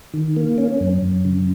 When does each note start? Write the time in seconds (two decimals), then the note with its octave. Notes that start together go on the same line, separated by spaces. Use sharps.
0.14 D#3
0.36 A#3
0.58 C#4
0.80 F#2
1.02 F#2
1.25 C#3